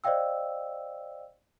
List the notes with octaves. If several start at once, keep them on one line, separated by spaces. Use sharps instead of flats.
C5 D5 D#5 F5 G5 E6